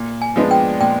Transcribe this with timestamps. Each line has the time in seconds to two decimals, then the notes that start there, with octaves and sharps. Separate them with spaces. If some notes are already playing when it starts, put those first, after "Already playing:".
Already playing: A#2
0.22 G#5
0.36 F3 G#3 B3 D4
0.51 G5
0.80 A#2 G5